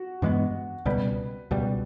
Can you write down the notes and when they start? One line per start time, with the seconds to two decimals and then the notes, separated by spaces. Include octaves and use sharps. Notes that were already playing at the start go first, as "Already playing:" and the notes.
Already playing: F#4
0.22 G2 E3 G#3 B3
0.85 C#2 B2 G3 B4
1.51 C#2 B2 G3